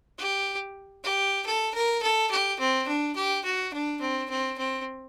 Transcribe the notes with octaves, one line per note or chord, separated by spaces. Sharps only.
G4
G4
A4
A#4
A4
G4
C4
D4
G4
F#4
D4
C4
C4
C4